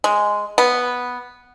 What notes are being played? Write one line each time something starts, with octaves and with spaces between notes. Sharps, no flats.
G#3
B3